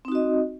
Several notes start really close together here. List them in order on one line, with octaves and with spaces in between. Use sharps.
C4 D#4 F#4 D#5